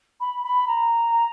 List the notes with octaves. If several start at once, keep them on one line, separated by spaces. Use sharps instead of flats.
B5
B5
A#5